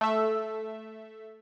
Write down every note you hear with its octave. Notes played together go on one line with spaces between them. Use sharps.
A3 E5